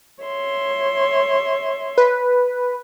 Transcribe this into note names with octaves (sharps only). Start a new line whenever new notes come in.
C#5 E5 C6
B4